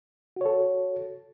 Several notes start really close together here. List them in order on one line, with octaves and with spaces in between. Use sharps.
F#4 C#5 A4